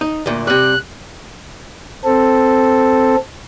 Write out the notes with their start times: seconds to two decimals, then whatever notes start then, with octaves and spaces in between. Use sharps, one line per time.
0.01 D#4
0.26 D2 A#2
0.47 C3 G3 F#6
2.04 C4 A4